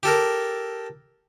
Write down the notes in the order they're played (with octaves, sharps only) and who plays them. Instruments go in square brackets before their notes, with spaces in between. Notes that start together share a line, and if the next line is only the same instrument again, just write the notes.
[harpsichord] G4 A4 A#4